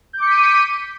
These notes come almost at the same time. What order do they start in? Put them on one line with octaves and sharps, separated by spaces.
G6 D6 C#7 B6 D#7